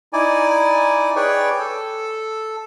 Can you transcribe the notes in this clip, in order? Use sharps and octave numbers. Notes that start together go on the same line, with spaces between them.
D#4 E4 D5 G#5
G#4 B4 C#5 D5 G5
A4